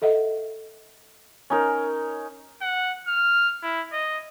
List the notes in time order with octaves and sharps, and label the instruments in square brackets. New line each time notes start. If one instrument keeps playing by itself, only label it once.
[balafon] A4 D#5 E5 F#5
[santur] C#4 D#4 A#4
[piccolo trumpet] F#5
F6
E4
D#5